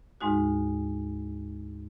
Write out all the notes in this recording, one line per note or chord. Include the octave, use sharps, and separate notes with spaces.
D2 G#2 G#3 D#4 F#4